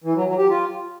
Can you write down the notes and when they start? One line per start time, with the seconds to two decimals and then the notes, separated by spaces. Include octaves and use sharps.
0.04 E3
0.15 F#3
0.26 F#3
0.38 G4
0.49 F4